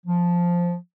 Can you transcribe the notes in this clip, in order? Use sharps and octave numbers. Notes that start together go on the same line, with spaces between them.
F3